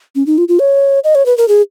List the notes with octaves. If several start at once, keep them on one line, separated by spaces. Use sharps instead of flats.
C#4
D#4
F4
F4
C#5
D#5
C#5
B4
A#4
G#4